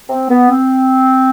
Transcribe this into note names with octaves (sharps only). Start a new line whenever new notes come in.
C4
B3
C4